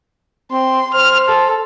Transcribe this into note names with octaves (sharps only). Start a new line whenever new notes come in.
C4 C6
C5 F6
A4